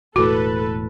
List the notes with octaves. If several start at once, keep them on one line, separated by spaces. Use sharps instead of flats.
E1 A2 F#4 A4 B4